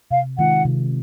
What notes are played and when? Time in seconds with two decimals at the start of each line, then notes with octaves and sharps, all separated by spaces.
0.11 C3 F5
0.38 D#3 G#3 C4 F4 F#5
0.65 C3